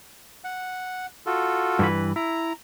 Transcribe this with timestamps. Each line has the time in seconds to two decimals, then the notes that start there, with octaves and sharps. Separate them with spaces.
0.44 F#5
1.26 F4 F#4 A4
1.79 G2 E3 B4
2.16 E4 A#5